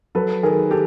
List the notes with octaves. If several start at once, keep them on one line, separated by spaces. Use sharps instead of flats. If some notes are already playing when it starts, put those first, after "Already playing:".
F#3 A4 B4
D#3 G#4 A#4
G4 A4